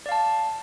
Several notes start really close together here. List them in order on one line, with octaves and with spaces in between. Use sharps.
D5 F5 A5